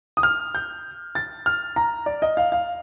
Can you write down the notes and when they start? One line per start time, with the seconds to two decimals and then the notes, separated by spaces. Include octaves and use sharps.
0.17 D#6
0.23 F6
0.55 G6
1.15 A6
1.46 F6
1.76 A#5
2.06 D5
2.22 D#5
2.37 F5
2.52 F5